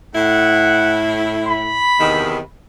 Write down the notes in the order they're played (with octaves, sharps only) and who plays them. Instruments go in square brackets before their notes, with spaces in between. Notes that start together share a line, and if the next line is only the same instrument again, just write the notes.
[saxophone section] A2 E4 [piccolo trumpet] F#5
[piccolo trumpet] B5
[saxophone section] E2 C3 D#3